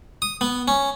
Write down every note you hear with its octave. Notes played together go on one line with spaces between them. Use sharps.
D#6
B3
C#4